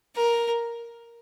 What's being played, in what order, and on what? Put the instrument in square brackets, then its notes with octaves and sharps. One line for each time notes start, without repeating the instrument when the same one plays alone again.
[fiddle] A#4